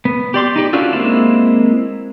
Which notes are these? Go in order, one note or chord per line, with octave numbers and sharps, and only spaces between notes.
B3
G4 D5 C6 D6
D#4 G4
C#4 D4 F4 F#4 A4
G#3 A#3 C4 E4